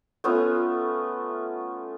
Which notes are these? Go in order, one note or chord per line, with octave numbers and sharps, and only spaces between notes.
A3 B3 C#4 F4